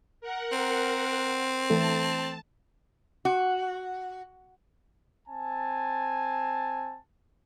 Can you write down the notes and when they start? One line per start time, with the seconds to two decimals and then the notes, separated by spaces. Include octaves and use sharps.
0.21 A#4 F#5
0.52 C4
1.70 E3 A3 A4 A5
3.25 F#4
5.29 C4 G#5 A5